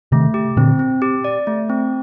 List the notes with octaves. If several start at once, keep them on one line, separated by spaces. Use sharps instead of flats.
C3 D#3 A3
G4
A#2 D3 C4
C4
G4
D5
A3
C4